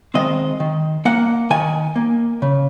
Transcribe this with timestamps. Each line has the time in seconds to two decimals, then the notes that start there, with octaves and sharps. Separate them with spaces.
0.14 D#3 G#3 C4 D#5
0.60 D#3
1.05 A#3 F#5
1.50 D#3 G#5
1.96 A#3
2.42 C#3